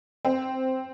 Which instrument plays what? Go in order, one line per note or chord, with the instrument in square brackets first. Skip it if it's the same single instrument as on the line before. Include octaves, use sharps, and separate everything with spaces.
[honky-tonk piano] C4